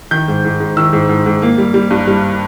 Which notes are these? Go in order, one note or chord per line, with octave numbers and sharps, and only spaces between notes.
D#3 G6
G#2
G#2
G#2
D#3 E6
G#2
G#2
G#2
A#3
G3
G3
G2
G3